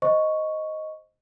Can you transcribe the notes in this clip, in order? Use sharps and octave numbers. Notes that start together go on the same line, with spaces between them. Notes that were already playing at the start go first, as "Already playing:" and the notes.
C5 D#5 C#6